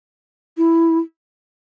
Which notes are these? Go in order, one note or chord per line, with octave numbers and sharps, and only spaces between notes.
E4